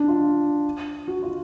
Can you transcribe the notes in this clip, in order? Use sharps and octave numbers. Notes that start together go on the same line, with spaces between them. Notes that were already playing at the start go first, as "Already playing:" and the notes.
Already playing: D4
F4
F#4
F4